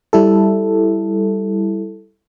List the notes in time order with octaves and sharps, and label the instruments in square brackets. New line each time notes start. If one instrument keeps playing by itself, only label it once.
[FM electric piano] G3 E4 A4